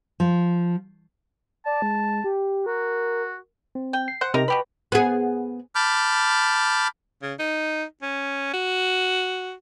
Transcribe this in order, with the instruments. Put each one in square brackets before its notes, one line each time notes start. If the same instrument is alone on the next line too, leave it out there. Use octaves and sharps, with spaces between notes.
[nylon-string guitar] F3
[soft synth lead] D5 [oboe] A5
[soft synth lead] G#3
G4
[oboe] F#4 [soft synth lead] A#4
[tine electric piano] C4
[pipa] G5
[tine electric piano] C7
[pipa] C5 F#5
[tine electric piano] C3 G4 [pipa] D#4 A#4 A#5
[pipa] B2 G4 B5 [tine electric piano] B4
[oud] B3 G#4
[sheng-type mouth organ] A5 B5 D6 F6 G6
[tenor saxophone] C#3
D#4
C#4
F#4